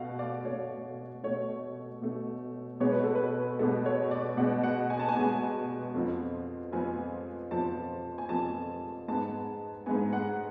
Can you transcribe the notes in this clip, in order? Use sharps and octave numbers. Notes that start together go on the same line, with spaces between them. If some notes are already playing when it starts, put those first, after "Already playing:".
Already playing: B2 A3 F5 F#5
D5
B2 A3 C#5
B2 A3 C#5
B2 A3
B2 G#3 B3 C#5
B4
A4
B4
B2 G#3 B3 A4
C#5
D5
B2 G#3 B3 F#5
F#5
G#5
A5
G#5
B2 G#3 B3
F2 F3 B3
F2 F3 B3 G#5
F2 F3 B3 A5
G#5
F2 F3 B3 A5
G#2 G#3 B3 A5
G#2 G#3 B3 G#5
F#5